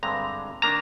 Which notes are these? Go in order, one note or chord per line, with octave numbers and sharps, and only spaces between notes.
G2 D3 G#3 C4 A#5
D#3 A#3 D4 A#5